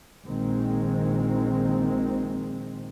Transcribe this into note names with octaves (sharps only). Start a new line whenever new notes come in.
A#1 D#3 G#3 C4